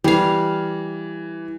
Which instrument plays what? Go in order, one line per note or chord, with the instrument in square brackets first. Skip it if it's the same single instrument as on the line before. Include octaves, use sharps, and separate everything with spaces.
[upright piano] E3 [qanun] G3 F5